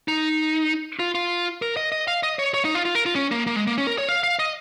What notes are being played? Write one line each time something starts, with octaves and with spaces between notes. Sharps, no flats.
D#4
F4
F4
A#4
D#5
D#5
F5
D#5
C#5
C#5
D#4
F4
F4
A#4
F4
C#4
A#3
A#3
G#3
A#3
C#4
A#4
C#5
F5
F5
D#5